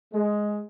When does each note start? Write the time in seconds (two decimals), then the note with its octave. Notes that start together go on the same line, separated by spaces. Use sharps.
0.13 G#3